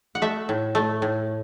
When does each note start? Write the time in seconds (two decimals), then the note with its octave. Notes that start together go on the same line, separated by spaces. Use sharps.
0.15 F#5
0.22 A3 E5
0.49 A2
0.75 A3
1.02 A2